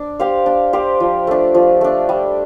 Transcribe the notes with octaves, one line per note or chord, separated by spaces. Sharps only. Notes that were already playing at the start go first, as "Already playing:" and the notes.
Already playing: D4
G4 C5 F5
D4
G4 C5 F5
F3
A3 D4
F3
A3 D4
G3